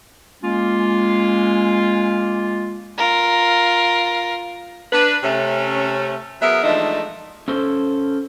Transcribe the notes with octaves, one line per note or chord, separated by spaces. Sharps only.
G#3 A#3 C#4 F4
F4 A#4
D4 B4
C3 A3 C#4
F#3 B3 G#4 A#4 E5
E3 F3 G#3 A3 D4 D#4
C#4 A4 C5